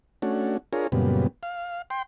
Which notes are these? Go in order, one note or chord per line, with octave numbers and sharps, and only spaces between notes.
A3 C#4 D4 F#4
D4 F4 G#4 A#4 C#5
F#2 A#2 C#3 G3 B3
F5
G5 C6